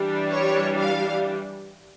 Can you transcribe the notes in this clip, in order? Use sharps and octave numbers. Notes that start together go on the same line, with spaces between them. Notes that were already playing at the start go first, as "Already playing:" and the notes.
Already playing: E3 G3 D4
C#5
F5